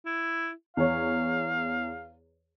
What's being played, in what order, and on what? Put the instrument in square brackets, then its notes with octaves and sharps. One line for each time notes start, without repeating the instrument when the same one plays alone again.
[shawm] E4
[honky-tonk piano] E2 C#5 [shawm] F5